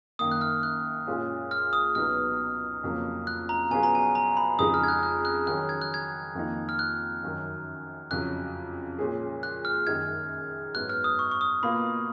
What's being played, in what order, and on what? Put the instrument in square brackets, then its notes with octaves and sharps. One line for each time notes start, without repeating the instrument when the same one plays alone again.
[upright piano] F#2 D#3 A#3 [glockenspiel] D#6
[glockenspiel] F#6
F6
F#6
[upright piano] A#2 G#3 C#4 F4
[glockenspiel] F6
D#6
[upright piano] C#2 B2 F#3 B3 D#4 [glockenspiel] F6
[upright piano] F2 C#3 F#3 A#3
[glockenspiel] F#6
A#5
[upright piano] B2 F#3 C#4 F4 G#4 [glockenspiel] G#5
[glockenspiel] A#5
G#5
A#5
B5
[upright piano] F2 C#3 G#3 D#4 [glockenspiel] D#6
[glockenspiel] F6
G#6
F#6
F#6
F#6
[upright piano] D#3 F#3 C#4 G#4 [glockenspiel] F#6
[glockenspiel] G#6
F#6
G#6
[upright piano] F2 D#3 A#3 D#4
[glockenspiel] F6
F#6
[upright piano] F#2 D#3 F#3
[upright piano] F2 C#3 F#3 [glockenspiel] F#6
[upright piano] A#2 G#3 C#4 G#4
[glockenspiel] F#6
F6
[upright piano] F#2 D#3 G#3 D#4 [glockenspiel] G#6
[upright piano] G#2 F#3 B3 [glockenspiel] F#6
[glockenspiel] F6
D#6
C#6
C#6
D#6
[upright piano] B2 A#3 F4 [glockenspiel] B5